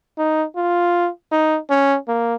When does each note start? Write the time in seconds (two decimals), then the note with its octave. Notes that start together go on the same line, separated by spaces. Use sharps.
0.18 D#4
0.56 F4
1.32 D#4
1.70 C#4
2.08 A#3